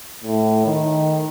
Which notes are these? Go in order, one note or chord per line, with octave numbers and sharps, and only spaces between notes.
A2
D#3